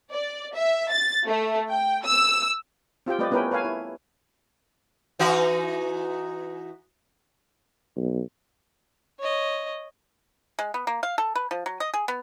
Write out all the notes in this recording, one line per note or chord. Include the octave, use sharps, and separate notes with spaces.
D5
E5
A6
A3
G5
E6
C4 F4 G4 G5
G3 A3 C4 B4 D5 D#5
B3 C#4 E4 A#4 B4 G5
A4 B4 C#5 F5 G#5
E4
E3 D#4 F#4
B1
C#5 D#5
G#3
B3
A#3
F5
A4
B4
F3
F#3
D#5
G#4
B3